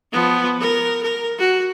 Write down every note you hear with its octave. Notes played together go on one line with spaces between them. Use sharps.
F3 B3
A#4
A#4
F#4